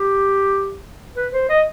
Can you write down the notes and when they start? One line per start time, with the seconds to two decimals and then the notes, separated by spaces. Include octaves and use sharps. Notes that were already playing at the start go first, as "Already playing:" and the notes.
Already playing: G4
1.16 B4
1.33 C5
1.49 D#5